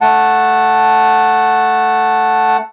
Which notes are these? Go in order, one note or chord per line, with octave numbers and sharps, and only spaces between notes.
A3 F#5 A5